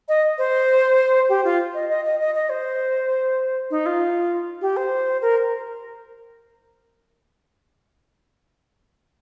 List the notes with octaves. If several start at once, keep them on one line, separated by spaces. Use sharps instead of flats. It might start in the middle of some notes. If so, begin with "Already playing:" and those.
D#5
C5
G4
F4
D#5
D#5
D#5
D#5
D#5
C5
D#4
F4
G4
C5
A#4